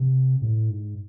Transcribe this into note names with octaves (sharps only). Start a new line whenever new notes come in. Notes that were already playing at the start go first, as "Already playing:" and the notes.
Already playing: C3
A2
G#2